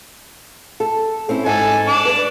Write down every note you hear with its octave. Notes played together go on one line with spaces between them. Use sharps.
A4
C4 C#4 E4
G#2 A4 G#5
D4 A5 D6
B4 D5